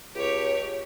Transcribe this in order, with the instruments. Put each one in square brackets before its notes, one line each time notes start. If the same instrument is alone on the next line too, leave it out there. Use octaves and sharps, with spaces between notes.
[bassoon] C#2 [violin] G4 C#5